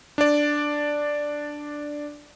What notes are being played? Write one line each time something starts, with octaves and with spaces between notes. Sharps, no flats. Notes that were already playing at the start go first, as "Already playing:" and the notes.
D4 D5